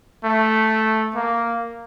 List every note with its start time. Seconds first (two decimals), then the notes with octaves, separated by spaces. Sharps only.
0.25 A3
1.15 A#3